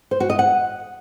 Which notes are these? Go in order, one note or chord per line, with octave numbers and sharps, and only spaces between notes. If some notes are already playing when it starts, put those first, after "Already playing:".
C5
F#4
D#5
F#5